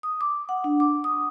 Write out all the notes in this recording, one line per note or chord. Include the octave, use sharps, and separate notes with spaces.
D#6
D6
F#5
D4
D6
D#6